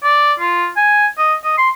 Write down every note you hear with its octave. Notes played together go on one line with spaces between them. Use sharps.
D5
F4
G#5
D#5
D#5
C6